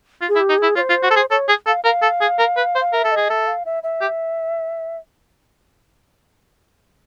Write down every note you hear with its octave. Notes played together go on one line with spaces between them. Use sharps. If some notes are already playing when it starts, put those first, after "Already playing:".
F4
G#4
E4
G4
D#4
E4 G#4
F4 C#5
C5
F4
F#4
A4
G#4
A4 C#5
G#4
A4 F5
A#4 F5
A4
G#4
A#4
B4
C5
F5
A#4 E5
A4
D#5
G#4
A4 E5
F5
E5
E5
G4